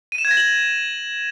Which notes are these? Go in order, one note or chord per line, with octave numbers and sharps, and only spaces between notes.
D#7
E7
G#6
A#6
F#7